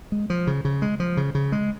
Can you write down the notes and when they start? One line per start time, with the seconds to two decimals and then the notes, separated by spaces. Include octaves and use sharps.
0.12 G#3
0.30 F3
0.47 C#3
0.65 C#3
0.82 G#3
1.00 F3
1.17 C#3
1.35 C#3
1.52 G#3